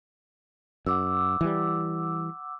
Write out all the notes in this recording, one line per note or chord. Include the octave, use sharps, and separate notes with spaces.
F#2 F#5 D6 E6
E3 G3